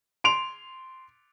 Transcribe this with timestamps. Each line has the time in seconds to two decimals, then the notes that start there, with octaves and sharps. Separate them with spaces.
0.24 C6 D7 F7